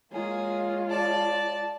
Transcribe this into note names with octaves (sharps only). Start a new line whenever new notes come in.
G#3 A#3 F4 G#4 C#5
D5 A5